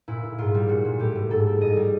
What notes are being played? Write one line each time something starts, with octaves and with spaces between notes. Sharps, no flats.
A#2 E4
A#2
G#2 F4
G3
A#2 F#4
A#2
A2 G4
A2
G#2 A4
G3
G#2 D#5
G3